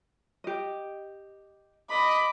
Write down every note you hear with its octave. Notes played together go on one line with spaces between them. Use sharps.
G4 D#5
D#5 B5 D6